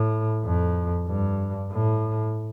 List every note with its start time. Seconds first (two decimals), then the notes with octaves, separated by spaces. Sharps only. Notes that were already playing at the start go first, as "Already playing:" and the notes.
Already playing: A2
0.44 F2
1.08 G2
1.72 A2